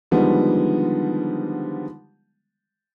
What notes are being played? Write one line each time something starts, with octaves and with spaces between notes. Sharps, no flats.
D3 D#3 F3 G3 G#3 B3